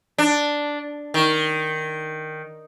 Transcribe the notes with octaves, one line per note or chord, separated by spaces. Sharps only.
D4
D#3